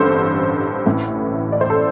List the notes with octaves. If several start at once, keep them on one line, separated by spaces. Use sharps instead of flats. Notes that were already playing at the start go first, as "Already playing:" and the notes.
Already playing: A1 G2 D3 A4 C5
A1 A2 E3
D5
C5
A4